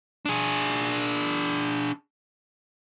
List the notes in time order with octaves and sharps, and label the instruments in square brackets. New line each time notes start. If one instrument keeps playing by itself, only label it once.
[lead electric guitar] D4 G#4